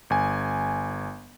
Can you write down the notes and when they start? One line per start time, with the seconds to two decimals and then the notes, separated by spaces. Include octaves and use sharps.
0.10 G1 G#5